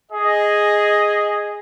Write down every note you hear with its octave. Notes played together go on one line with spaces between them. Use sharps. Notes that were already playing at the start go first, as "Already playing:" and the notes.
G#4 D#5